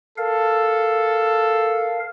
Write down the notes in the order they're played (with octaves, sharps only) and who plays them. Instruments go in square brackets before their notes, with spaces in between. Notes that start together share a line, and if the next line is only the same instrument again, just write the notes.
[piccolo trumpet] A4 [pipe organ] A#4 F5